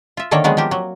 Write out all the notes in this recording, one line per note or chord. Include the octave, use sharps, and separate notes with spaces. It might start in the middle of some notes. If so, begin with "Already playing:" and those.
F4 E5
D3 D#3 A#3 A4 C#5 D5
F#3 G#3 B3 C4 G#4
F3 A#3 G4
F#3